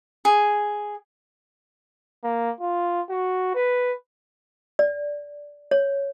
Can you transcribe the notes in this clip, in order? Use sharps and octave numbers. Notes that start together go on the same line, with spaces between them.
G#4
A#3
F4
F#4
B4
D5
C#5